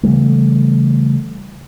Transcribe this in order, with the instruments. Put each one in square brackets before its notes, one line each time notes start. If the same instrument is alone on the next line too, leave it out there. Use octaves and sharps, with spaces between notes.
[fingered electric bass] C#3 E3 G3 A3